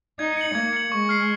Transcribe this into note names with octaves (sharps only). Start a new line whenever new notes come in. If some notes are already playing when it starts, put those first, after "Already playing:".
D#4 G#6
C#7 F#7
A#3 G#6
C#7 F#7
G#3 C#6
F6 C7